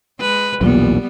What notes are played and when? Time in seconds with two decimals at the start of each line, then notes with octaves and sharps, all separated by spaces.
0.20 G#3 B4
0.61 B1 E2 A#2 G3 B3